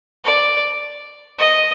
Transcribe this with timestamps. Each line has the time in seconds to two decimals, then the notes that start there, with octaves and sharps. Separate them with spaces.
0.25 D5
1.39 D#5